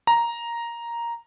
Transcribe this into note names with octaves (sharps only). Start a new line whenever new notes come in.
A#5